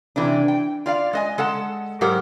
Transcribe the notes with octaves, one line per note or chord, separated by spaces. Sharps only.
C3 E3 A3 D4
G5
F4 D5 F5
G#3 D#5 G#5
G#3 A4 F#5 A5
G#2 F#3 G4 A#4 F#5